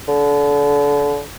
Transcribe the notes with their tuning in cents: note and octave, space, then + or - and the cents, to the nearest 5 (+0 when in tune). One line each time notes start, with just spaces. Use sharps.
D3 -30